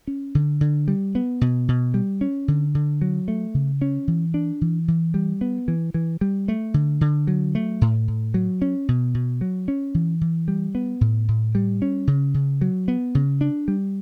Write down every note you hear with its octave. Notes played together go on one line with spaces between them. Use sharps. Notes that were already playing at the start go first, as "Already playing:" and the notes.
C#4
D3
D3
G3
B3
B2
B2
G3
C#4
D3
D3
F#3
A3
C#3
C#4
E3
D4
E3
E3
G3
B3
E3
E3
G3
A3
D3
D3
F#3
A3
A2
A2
F#3
C#4
B2
B2
F#3
C#4
E3
E3
G3
B3
A2
A2
G3
C#4
C#3
C#3
F#3
B3
C#3
D4
G3